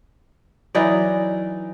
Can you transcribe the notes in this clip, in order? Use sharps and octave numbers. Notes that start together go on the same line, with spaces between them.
E3 F#3 D#4 D5